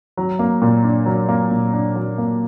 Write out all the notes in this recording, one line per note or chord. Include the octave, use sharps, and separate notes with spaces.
F#3
A#3
A#2
D4
F#3
A#3
A#2
D4
F#3
A#3